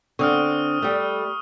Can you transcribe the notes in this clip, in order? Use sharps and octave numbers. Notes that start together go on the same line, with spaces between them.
D3 C4 C#6 D#6 F6
G3 A3